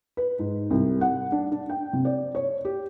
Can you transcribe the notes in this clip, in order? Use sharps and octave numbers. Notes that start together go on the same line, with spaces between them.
B4
G#2
C2
F#5
D4
D4
G5
C3
D5
C#5
G4